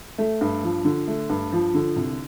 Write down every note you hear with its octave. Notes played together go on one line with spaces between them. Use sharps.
A3
G2
F3
D3
A3
G2
F3
D3
C2